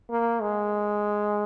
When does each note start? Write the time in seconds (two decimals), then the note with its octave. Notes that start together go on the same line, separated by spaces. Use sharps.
0.10 A#3
0.42 G#3